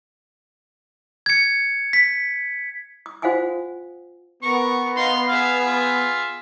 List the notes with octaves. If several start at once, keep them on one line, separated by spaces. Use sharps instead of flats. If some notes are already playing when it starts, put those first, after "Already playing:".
G#6 C#7
B6
D#6
F4 C5 F5 F#5 G#5 D#6
B3 A#4 C#6
D#4 F5 C6
G#4 E5 F5
F4